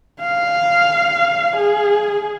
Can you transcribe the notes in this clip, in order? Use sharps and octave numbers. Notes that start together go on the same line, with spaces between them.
F5
G#4